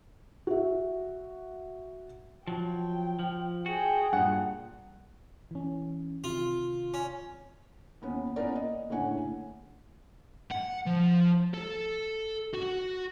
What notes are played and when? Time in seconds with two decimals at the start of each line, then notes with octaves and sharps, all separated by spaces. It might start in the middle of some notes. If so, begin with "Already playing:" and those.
0.47 F#4 E5
2.48 F3 F#3 G5
3.19 F3
3.66 F#4 G#4 G5
4.13 G2 A#2 F#5
5.51 E3 C#4
6.24 C3 D#3 F4
6.94 C#4
8.02 D#2 B3 C#4
8.36 A#3 B3 C#4 A#4 D5
8.56 D#5
8.90 F#1 A2 D3 C#5 F#5 G#5
10.51 F#5
10.86 F3
11.54 A4
12.54 F#4